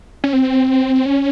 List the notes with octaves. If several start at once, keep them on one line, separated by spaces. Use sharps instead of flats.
C#4
C4
C#4